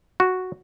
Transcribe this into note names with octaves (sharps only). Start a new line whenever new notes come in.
F#4